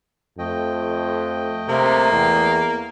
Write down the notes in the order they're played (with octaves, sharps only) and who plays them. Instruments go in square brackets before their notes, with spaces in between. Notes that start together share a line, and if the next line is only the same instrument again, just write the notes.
[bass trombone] F2 [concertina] A3 D#5 G5
[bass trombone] C3 [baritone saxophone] A#3
[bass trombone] E2